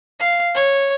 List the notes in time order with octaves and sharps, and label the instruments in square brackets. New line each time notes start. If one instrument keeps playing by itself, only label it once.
[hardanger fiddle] F5
C#5